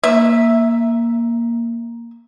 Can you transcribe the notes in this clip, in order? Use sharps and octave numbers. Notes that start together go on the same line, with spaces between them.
A#3 E5